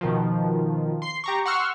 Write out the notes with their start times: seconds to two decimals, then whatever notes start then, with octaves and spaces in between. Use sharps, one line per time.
0.01 B2 D#3 F3
1.02 C6 C7
1.24 G4 A#5 C#6
1.45 F#5 C6 C#6 E6 F6